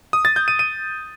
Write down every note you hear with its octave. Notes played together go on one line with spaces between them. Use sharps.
D#6
A6
G6
D#7
D#7